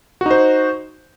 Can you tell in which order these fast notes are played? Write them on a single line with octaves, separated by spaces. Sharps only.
F#4 D#4 C5